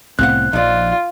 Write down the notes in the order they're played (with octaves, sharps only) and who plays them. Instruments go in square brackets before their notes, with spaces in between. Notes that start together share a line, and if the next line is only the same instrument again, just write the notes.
[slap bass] C2 A2 B3 [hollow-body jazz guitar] C4 F5 F#5 [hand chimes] F#6
[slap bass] A#1 F3 [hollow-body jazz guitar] D#4 D5 [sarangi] F4